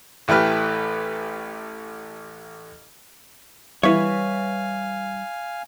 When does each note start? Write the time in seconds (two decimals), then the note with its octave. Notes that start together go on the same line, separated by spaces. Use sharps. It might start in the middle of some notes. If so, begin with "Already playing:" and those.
0.28 A1 E3 A3 G4 B4 F6
3.83 E3 G3 B4 C#5 E5 F5 G#5